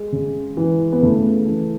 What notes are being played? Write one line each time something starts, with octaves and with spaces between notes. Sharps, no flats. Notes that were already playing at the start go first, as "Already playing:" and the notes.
Already playing: G#3
C#3
E3
B3
C#3 A3
E3